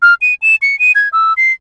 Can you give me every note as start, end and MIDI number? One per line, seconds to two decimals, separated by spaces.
0.02 0.14 89
0.21 0.34 99
0.42 0.56 100
0.62 0.78 97
0.79 0.92 99
0.95 1.09 92
1.13 1.33 88
1.37 1.52 96